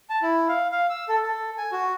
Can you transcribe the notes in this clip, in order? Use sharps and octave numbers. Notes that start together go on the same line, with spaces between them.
A5
E4
F5
F5
E6
A4
A4
G#5
F#4